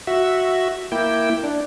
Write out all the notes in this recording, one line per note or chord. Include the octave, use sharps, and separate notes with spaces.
F#4 E5
A#3 E4 G5
D4